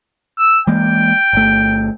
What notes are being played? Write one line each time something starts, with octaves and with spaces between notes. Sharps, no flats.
E6
E3 G#3 A#3 G5
G1 A3